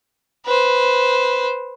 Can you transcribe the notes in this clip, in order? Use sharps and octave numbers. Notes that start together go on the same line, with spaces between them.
B4 C5